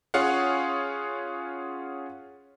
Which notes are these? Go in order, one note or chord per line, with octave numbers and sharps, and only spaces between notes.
C#4 F4 G#4 C#5 F5 F#5